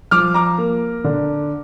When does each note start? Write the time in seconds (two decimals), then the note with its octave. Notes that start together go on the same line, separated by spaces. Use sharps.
0.11 F3 D6 F6
0.34 A#5 D6
0.58 A#3
1.04 D3